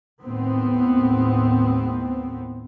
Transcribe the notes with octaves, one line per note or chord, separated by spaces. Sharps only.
D#2 A2 B3 C4